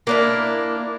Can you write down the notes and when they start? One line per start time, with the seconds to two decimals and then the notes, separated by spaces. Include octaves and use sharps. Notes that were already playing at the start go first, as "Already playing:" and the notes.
0.07 A#3 D4 E4